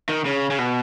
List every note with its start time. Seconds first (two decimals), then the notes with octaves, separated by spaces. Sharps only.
0.09 D#3
0.25 C#3
0.50 C#3
0.59 B2